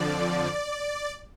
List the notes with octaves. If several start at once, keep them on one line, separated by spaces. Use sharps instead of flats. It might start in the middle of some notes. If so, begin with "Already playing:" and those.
Already playing: F2 D3 F3 D5